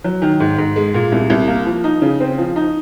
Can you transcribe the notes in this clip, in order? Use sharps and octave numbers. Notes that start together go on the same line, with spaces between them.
F#3
D#3
G#2
G#2
G#3
A#2
C2
C2
A#3
F3
D#4
C#3
C4
F3
D#4